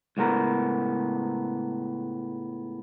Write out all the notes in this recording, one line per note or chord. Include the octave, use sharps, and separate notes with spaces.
C#2 A2 B3 A#4